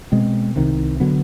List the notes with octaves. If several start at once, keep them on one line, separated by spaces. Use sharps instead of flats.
B2 G#3 C4
C2 C3 D#3
D3 F#3 B3